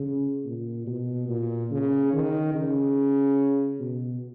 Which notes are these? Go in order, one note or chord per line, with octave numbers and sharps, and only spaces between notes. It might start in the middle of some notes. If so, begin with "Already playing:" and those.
Already playing: C#3
A#2
B2
A#2
C#3
D#3
C#3
B2